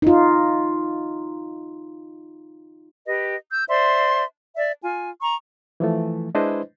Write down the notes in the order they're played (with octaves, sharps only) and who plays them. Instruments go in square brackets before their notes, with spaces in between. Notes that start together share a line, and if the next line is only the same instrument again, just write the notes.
[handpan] D#4 F4
[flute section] G4 B4 D#5
E6 G6
C5 D5 E5 C6
D5 E5
F4 G#5
A#5 C#6
[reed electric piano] E3 F3 A3
G#3 D4 E4 B4 C5 D#5